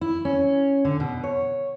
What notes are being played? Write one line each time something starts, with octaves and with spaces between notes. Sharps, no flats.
E4
C#4
D3
B2
C#5